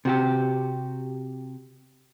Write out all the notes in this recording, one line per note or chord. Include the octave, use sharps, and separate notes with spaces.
C3 F#4 G4